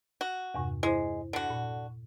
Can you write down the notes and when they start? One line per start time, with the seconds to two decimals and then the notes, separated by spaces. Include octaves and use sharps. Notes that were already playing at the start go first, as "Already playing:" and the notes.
0.21 F#4
0.54 E2 G2 C3
0.83 G#3 E4 C5
1.33 D3 F#4
1.50 A#2